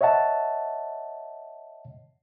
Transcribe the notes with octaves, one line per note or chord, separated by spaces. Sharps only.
C#5 D#5 E5 F#5 A5